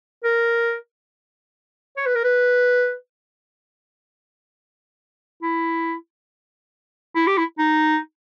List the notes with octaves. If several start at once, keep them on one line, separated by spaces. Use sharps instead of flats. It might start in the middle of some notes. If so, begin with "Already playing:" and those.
A#4
C#5
B4
A#4
B4
E4
E4
G4
E4
D#4